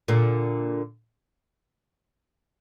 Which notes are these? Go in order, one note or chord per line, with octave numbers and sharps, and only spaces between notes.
A#2 D3